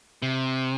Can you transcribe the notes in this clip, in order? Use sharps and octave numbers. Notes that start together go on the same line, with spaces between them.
C3